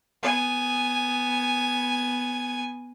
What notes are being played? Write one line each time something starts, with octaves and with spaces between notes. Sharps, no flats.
B3 G#5